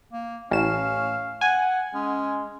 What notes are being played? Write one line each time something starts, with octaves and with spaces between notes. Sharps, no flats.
A#3
A1 C#4 F5 E7
F#5 G#5
G#3 C#4